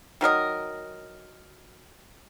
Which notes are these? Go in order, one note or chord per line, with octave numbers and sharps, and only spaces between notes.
D#3 F#3 A#4 D#5